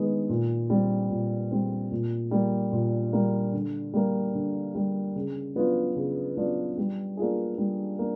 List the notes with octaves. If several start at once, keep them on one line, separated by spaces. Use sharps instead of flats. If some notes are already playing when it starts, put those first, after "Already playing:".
Already playing: D#3 G#3 B3
A#2
G3 C4
A#2
G3 C4
A#2
G3 A#3
A#2
G3 A#3
D3
G3 A#3
D3
G3 A#3
C#3
F#3 B3 D4 F4
C#3
F#3 B3 D4 F4
G3
A#3 D4 F4 G#4
G3
A#3 D4